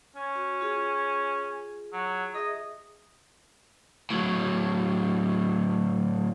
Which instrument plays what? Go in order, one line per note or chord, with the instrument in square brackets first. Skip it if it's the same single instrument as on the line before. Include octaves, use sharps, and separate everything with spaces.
[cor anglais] C#4
[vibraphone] F#4
F4 G#4
[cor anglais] F#3
[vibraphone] G#4 E5 [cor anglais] D#5
[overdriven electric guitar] A2 F#3